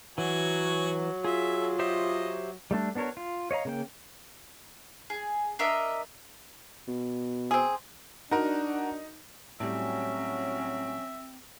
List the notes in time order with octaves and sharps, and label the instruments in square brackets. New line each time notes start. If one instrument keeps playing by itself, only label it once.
[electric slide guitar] E3 [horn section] F#3 [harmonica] F#4 G#5
[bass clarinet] F4 [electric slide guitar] G#4 [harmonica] E5
[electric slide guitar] G4 C5 E5 [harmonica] D#5
[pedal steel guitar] G3 A3 D4
B3 D4 F#4 A#4 C#5
F4
C#5 D#5 F5 A#5
C#3 A#3 G5
[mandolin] G#4
D4 A#4 D#5 E5
[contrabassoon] B2
[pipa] C4 G#4
[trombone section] D4 [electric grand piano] D#4 [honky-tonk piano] F#4 A#4
[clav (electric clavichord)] A2 G3 [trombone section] F#3 C#4 [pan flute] C4 [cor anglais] E5